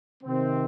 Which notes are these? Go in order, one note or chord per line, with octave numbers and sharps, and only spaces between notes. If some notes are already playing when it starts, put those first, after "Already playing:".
C3 D#3 C4